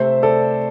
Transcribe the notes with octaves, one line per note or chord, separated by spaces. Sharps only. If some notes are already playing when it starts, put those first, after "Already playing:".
Already playing: C3 A3 C4 C5 E5
A4 D5